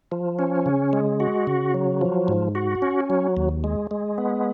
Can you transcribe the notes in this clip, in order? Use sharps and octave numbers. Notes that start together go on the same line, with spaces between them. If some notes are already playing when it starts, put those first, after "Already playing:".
F3
C#4
C#3
G#3
F#4
C#3
F#3
F3
G#2
F#4
C#4
F#3
D#2
G#3
G#3
B3